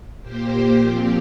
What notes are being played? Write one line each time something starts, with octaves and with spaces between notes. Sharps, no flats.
A#2 A#3 G4 C5
G4
A#2 F3 C4 G4